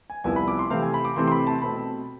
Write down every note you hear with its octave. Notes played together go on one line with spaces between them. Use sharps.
G#5
C2 C3 F3 B3 E4 G#5
B5
D6
C6
C3 E3 A3 C4 F5
G#5
B5
D6
C3 E3 A3 C4 C6
C6
B5
A5
B2 A3 C4 B5